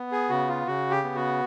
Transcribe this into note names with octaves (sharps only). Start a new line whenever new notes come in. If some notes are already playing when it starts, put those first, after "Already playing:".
Already playing: B3
G#4
C#3 F#4
F4
C#3 F#4
G4
B3
F#4